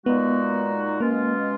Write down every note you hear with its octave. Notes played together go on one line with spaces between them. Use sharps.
A#2 G#3 B3 D#4 F#4
B2 G#3 A#3 C#4 F4